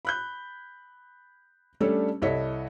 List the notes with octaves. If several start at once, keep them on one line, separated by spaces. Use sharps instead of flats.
B5 F#6 G6
G3 A3 C#4 D4 A4 C#5
C2 E4 A4 C#5 D#5 B6